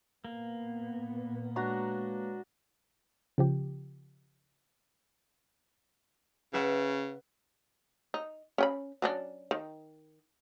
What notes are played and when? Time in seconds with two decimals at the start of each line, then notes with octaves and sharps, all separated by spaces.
0.25 A#2 A#3 B3
1.56 G#3 D4 F#4 B4 C#5 A#5
3.38 C#3 F3 G4
6.54 C#3 B4 E5 F#5
8.14 D#4
8.58 C#4 G5 B5
9.02 F#3 C#4 D4
9.51 D#3